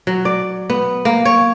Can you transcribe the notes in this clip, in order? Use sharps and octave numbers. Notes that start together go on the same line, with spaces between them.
F#3
D5
B3
A#3
C#5